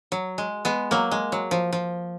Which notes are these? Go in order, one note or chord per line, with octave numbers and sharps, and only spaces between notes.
F#3
G#3
G#3 B3
F#3 A#3
G#3
F#3
F3
F3